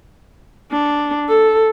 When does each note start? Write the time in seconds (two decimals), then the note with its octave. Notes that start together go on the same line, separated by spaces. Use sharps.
0.71 D4
1.29 A4